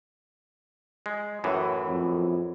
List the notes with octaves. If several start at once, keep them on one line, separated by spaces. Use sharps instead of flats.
G#3
F#2 A2 E3
F2